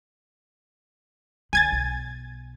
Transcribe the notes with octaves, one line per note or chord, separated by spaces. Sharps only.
D3 D#3 G#5 G#6 A6
B1